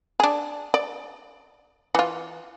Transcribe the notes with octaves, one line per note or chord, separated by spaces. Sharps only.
D4 G#4
D5
E3 F4